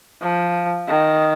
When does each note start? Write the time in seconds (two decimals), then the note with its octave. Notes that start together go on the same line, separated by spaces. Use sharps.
0.22 F3
0.88 D#3